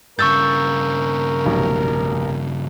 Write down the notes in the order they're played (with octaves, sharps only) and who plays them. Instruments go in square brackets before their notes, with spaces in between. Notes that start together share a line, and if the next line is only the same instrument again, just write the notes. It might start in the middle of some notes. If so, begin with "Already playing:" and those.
[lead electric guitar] G2 C#3 [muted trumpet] A#4 [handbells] C#6 E6 G6 [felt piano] A6
[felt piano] F1 B1